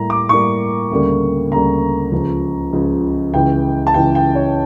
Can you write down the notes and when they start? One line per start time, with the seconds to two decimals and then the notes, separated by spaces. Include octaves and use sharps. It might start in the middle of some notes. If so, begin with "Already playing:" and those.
Already playing: A2 G3 A#3 A#5
0.10 D6
0.29 A2 G3 A#3 C#6
0.91 D2 C#3 G3 A#3
1.51 D2 C#3 G3 A#3 A#5
2.12 C#2 C#3 F3
2.73 C#2 C#3 F3
3.34 C#2 C#3 E3 G5
3.87 A5
3.94 C#2 C#3 E3 G5
4.15 G5
4.35 C#5